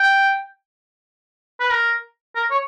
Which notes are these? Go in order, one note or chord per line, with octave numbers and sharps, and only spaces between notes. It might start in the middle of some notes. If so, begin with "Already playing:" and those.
Already playing: G5
B4
A#4
A#4
C#5